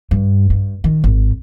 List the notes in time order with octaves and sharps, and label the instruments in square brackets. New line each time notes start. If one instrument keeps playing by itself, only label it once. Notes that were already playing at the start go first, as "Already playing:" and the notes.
[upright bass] G2
G2
D#3
G#1